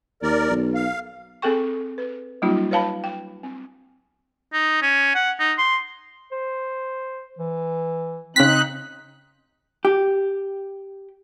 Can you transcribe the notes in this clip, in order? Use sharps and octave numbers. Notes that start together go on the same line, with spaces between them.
D#2 A#4 D5
B1
F5
C4 G#4 A4 G5 C#6
B4
F#3 G3 A#3 D4 E4 F#4
B4 C#5 F5 A5 B5
G5
C4
D#4
C#4
F#5
D#4
C6
C5
E3
C#3 C4 D#4 F#6 B6
G4